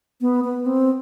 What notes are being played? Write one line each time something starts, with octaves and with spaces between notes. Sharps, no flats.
B3
B3
C4